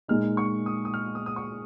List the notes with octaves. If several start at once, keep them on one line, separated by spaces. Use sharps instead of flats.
A#2 G#3 D#4 F6
C#6
D#6
D#6
F6
D#6
D#6
C#6